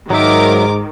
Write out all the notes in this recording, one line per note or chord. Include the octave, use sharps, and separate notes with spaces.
G#2 D#3 F#3 D#4 A#4 E5 D6